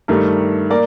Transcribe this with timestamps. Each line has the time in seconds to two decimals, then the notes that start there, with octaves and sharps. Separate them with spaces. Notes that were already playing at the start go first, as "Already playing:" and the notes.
0.08 G2 D#3 A3 G4 A#4
0.70 A#3 A#4 D5